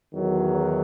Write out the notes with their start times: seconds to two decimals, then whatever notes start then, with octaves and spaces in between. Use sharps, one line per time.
0.12 E2 D#3 F#3